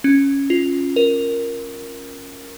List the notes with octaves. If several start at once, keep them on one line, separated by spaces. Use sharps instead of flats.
C#4
F4
A#4